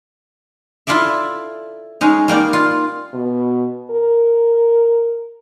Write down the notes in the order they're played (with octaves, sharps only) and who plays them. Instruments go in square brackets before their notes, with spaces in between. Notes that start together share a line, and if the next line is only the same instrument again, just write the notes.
[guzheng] E4 F4 A4 D5 E5
G#3 C#4 D#4
G3 A#3 D#4 D5
F4
[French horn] B2
A#4